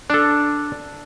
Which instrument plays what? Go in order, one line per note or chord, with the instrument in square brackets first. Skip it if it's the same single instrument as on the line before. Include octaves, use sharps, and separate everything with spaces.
[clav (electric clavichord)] D4 A4